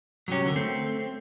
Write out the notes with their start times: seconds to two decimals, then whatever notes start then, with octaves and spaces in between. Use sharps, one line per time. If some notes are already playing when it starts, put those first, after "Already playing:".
0.28 G2 C3 F#3 C#4 G4
0.44 D2 D3 A#4
0.56 A3 C4